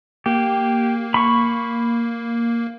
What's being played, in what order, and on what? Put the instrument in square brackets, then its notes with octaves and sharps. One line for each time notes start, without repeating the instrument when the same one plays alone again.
[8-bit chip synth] A#3 [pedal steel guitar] G4
[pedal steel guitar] B5 C#6